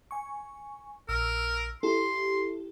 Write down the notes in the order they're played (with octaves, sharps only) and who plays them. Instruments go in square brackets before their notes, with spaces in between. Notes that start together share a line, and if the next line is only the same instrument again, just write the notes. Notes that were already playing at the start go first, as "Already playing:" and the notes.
[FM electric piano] G#5 C#6
[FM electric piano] A#1 E6 [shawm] A#4
[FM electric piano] E4 G4 A4 [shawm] C6